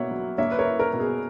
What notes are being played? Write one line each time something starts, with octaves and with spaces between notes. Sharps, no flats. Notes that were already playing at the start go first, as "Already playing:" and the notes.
Already playing: B2 A#3 C#5 E5 F#5
F#3
A#3 C#5 E5
B4
A#4 C#5
E4
A#4
B2
G#4